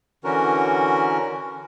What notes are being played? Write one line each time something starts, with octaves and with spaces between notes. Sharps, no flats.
D3 E3 C#4 F#4 A#4